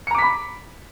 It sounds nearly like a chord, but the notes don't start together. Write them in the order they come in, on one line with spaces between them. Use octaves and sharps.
C#7 A#5 D6 B6 B5